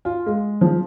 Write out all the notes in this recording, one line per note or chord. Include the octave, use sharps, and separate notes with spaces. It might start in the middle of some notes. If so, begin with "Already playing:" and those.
F4
G#3
F3